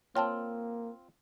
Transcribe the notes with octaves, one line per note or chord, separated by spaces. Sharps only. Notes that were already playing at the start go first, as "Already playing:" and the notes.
A#3 C4 F4 C#5 G5 A5